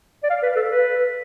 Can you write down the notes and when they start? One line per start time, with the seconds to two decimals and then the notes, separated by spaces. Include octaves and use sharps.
0.23 D5
0.30 F5
0.43 B4
0.56 A4
0.70 B4